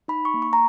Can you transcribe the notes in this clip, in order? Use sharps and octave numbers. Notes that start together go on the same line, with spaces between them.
D#4 B5
C#6
A#3
C#6
A#5